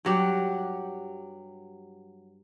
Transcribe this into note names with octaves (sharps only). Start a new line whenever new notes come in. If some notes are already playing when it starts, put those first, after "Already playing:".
G2 F#3 G4 F#5